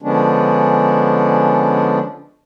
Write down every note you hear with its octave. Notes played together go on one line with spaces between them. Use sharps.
D3 F3 G#3 B3 C#4 D4